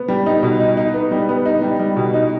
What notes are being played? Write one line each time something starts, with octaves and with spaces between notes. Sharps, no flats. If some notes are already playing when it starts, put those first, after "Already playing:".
Already playing: B3
G3
D#4
B2
D#4
D#4
B3
G3
B3
D#4
G3
G3
B2
D#4